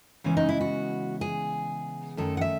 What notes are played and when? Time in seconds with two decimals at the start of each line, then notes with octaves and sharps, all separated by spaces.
0.24 C#3 E3 G#3 B3 C#4
0.37 D#4
0.49 E4
0.61 F#4
1.21 G#4
2.17 F#2 D#3 A3 A4
2.37 F#5
2.41 E5